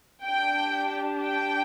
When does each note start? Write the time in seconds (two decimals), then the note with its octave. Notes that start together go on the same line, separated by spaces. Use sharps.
0.25 D4 G4 G5
1.25 G5